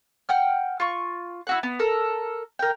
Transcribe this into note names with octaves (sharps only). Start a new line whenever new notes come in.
F#5 G5 F6
F4 C#6
E4 F#4 F#5
B3
A4 A#4
A#4 G5